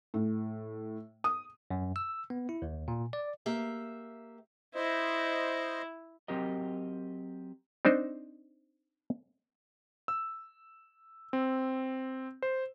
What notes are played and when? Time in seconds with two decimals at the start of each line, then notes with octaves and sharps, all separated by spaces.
0.14 A2
1.24 D#6
1.71 F#2
1.96 E6
2.30 B3
2.49 E4
2.62 D#2
2.88 A#2
3.13 D5
3.46 A#3 G4 E5
4.75 E4 C5 D#5
6.28 F#3 C4 G4 A#4 D#5
7.85 C4 D4 D#4 C5
10.08 E6
11.33 C4
12.42 C5